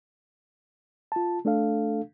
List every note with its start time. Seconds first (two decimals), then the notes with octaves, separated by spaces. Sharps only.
1.12 F4 A5
1.45 A3 D4 A4 F5